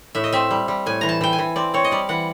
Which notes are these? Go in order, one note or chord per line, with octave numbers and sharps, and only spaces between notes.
A2 E5
D#5
C4 E5
G3
G3
A2 G#5
E3 A#5
A5
E3 G5
G#5
E3
C4 D5
C4 C#5
D#5
G3 D5
E3 F#5